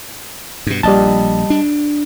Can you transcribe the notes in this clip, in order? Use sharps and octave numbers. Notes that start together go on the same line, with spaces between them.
G2 B2
A#1 G3 D#5 A5
D4